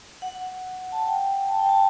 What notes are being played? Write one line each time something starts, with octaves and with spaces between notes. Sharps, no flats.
F#5
A5
G5
A5
G5
A5